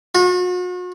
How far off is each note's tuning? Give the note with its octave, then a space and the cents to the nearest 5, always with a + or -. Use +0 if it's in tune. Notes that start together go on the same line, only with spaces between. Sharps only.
F#4 -40